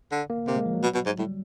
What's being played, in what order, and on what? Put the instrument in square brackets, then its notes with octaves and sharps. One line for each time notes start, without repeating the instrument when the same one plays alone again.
[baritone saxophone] D3
[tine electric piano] A#3
[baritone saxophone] C3 [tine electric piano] A#3
[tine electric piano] G#3
F3
F#3
[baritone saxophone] B2
B2
G#2
[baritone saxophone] A2 [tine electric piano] G3